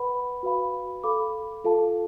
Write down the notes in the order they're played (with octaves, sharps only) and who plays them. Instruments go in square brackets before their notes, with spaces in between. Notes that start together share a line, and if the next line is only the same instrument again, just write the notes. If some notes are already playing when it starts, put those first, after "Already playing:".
Already playing: [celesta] B4 F#5 B5
F#4 B4 F5 B5
A4 F5 B5 D6
F4 A4 F5 A5